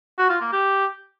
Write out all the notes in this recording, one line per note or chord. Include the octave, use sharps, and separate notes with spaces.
F#4
F4
A#3
G4